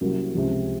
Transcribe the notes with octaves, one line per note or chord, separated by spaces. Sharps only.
C2 C3 F#3 A#3 C#4
C#2 C3 F3